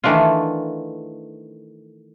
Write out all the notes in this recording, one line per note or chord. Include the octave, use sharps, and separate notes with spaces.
D#3 E3 A3 D4 F4